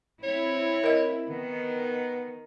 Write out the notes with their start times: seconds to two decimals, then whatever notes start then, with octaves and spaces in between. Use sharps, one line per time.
0.23 C4 E4 C#5
0.84 A#4 D#5
1.29 D#3 B3